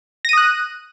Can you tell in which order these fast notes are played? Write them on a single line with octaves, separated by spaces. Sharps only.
A#6 D#7 D#6 F#6